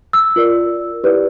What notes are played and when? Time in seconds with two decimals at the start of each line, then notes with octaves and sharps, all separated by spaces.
0.13 E6
0.36 F4 A#4 D5
1.04 E4 G4 B4 D5